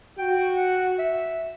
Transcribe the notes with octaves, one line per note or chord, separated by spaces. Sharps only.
F#4 G5
F#5
E5